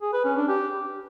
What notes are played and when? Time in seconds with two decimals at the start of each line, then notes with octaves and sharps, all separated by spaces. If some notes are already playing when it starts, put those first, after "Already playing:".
0.01 G#4
0.13 B4
0.24 C#4
0.36 D4
0.48 G4